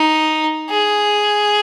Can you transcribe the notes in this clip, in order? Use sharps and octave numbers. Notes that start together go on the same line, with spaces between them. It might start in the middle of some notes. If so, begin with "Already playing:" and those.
Already playing: D#4
G#4